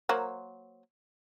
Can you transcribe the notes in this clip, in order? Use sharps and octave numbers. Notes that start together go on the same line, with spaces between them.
F#3 A#3 C5